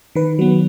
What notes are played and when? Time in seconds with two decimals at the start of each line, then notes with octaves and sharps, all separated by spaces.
0.15 D#3 B4
0.39 F#3 B3